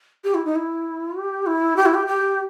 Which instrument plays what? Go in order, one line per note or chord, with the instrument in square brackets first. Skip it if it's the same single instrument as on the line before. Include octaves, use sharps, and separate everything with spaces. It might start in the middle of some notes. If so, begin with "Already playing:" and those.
[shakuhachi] G4
E4
D#4
E4
G4
E4
G4
E4
G4
G4